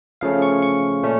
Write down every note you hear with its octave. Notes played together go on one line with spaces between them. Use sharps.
C#3 F3 A3 C#4 F5
C#6
C#6
A#2 A3 C#4